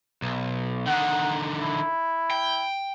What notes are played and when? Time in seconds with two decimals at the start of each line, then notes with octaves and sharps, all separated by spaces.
0.22 B1
0.86 D3 D#3 F#5
1.61 E4
2.31 G5